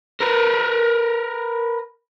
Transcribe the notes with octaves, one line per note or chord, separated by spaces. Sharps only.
A#4 B4